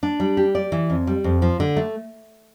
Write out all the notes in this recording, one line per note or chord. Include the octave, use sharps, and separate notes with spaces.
D4
G3
G4
D5
E3
F2
G3
F2
F3
D3
A3